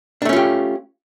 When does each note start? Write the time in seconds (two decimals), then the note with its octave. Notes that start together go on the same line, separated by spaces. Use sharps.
0.22 D4
0.25 A3
0.29 C#4
0.33 F4
0.36 G4